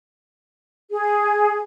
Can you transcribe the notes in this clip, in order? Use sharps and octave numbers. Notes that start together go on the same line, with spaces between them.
G#4